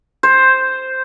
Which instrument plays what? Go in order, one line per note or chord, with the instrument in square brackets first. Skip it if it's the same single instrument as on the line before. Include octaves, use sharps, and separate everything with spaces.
[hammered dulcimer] C5